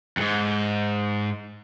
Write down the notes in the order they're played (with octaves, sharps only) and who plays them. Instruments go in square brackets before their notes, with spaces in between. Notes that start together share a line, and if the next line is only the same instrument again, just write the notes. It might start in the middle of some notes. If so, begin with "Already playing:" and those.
[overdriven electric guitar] F2 G#2